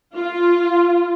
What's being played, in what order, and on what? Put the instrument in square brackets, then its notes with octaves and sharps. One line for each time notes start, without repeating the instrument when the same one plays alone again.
[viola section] F4